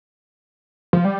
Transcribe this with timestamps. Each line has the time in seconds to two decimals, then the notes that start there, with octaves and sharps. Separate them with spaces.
0.93 F3
1.05 G3